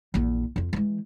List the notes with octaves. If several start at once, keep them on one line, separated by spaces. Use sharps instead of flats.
A#1 E2
F2 F4
E3 G#3